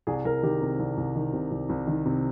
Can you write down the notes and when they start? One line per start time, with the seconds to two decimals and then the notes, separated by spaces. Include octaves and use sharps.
0.07 C2 G#4
0.25 C2 A#4
0.43 D#3 G4
0.62 C3
0.79 C2
0.97 C2
1.15 D#3
1.33 C3
1.51 C2
1.69 C2
1.87 D#3
2.06 C3